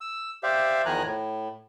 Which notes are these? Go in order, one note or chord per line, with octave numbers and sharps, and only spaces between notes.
E6
G4 C5 D5 E5 F5
E2 D#3 F3 G#5 A#5 F#6
A2